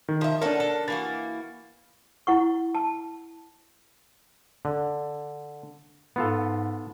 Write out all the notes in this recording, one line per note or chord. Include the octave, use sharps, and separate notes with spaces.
D#3
F3 E5
C#4 D4 A4 A#4 F#5
A4
E3 A#3 F#4 A6
E4 F#5 C#6
A5
D3
G#2 B3 F4 A4